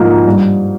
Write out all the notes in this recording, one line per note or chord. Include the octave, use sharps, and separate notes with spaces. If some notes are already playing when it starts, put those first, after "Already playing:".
Already playing: G#2 F3 A#3 D#4
G2